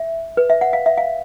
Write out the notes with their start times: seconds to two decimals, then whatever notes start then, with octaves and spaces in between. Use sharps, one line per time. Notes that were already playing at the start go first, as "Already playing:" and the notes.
Already playing: E5
0.37 B4
0.50 E5
0.61 F#5
0.73 F5
0.86 E5
0.97 F5